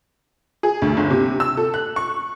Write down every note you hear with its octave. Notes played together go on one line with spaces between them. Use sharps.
G#4
D2
G1
C3
E6
A4
F#6
C#6